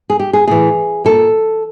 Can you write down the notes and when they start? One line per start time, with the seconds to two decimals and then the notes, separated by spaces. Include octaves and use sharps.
0.10 G#4
0.19 G4
0.33 G#4
0.47 A2 E3 G#4
1.04 A#2 A4